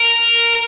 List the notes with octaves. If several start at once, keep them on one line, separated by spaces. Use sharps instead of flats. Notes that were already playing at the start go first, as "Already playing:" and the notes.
Already playing: A#4